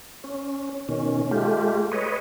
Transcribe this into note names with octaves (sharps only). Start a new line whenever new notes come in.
C#4
B2 D#3 C#4
G#3 A3 F4 G4
B4 C#5 D#5